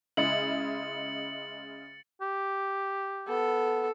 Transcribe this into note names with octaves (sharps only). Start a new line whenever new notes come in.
C#3 G#3 E4 A6 C#7 F#7
G4
B3 A4